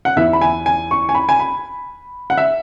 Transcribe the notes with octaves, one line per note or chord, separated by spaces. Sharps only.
F#5
E2 E3 E5
B5
G#5
G#5
C#6
G#5
B5
G#5
B5
F#5
E5